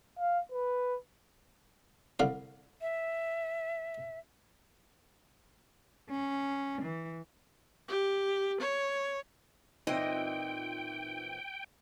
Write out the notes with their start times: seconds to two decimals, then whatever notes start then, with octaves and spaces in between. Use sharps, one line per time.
0.18 F5
0.52 B4
2.19 C2 D3 F5
2.81 E5
6.11 C#4
6.82 E3
7.88 G4
8.60 C#5
9.87 A#2 E3 C4 D#4 F4 D#5 G5